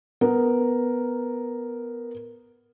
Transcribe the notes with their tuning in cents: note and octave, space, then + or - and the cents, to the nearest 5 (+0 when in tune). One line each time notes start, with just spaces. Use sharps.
B3 +0 A#4 +0